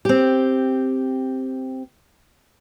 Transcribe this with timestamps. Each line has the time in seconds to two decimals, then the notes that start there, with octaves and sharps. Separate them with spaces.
0.05 C4 G4